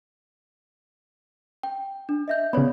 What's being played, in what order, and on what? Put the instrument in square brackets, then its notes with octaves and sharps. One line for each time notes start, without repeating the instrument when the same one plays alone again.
[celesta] G5
D4
D#5 E5 G6
[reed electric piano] C#3 B3 [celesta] C#5 D5 B5